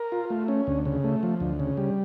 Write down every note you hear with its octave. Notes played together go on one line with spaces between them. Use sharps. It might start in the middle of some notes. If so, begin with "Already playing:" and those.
Already playing: A#4
F4
A3
C#4
D2
C#3
A3
F3
D2
C#3
G3